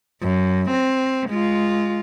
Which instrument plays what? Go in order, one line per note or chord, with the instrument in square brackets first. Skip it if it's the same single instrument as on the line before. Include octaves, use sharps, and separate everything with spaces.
[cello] F#2
C4
G#3 F4